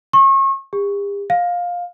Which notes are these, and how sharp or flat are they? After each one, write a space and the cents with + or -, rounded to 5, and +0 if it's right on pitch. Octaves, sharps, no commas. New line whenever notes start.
C#6 -35
G4 +45
F5 +15